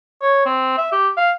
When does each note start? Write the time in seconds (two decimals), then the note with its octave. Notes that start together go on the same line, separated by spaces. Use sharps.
0.22 C#5
0.46 C4
0.78 E5
0.92 G4
1.17 F5